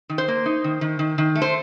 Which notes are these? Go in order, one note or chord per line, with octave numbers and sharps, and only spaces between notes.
D#3
C5
A#3
D#4
D#3
D#3
D#3
D#3
A3
C5